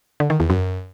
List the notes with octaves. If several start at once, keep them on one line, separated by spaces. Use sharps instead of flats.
D3
D#3
E2
F#2